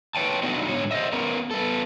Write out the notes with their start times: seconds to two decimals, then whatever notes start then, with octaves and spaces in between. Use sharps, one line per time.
0.15 B4 C#5 G5 A5
0.43 A3 B3 D4 D#4 F#4
0.68 G#2 D3 C#5
0.91 C5 D#5 E5
1.13 B3 C#4 A#4
1.51 B3 A4